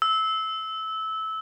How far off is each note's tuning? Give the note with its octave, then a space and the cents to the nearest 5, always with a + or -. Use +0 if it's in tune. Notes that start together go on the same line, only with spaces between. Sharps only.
E6 -20